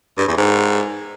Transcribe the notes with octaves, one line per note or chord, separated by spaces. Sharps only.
G2
E2
G#2